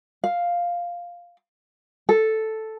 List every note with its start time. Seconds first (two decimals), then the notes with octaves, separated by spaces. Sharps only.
0.24 F5
2.09 A4